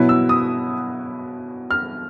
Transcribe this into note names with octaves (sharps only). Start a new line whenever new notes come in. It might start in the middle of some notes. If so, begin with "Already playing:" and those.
Already playing: B2 F#3 B3 E4
E6
D#6
F6